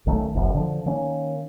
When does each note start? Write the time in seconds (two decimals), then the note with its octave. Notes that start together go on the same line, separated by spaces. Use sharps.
0.06 B1 D#3 A3 C#4
0.35 F#1 B1 F#2
0.55 D3 F3
0.86 D#3 A#3 C#4